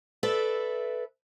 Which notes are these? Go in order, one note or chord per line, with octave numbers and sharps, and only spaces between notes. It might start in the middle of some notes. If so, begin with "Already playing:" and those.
A4 B4 D5 E5